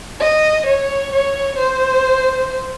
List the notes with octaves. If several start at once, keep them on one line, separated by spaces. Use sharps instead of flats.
D#5
C#5
C#5
C5